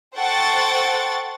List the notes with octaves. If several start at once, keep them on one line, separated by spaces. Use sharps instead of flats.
A4 C5 F#5 G5 C#6 A6